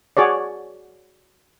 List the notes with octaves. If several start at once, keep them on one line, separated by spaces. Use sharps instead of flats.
F#4 G#4 C#5 D5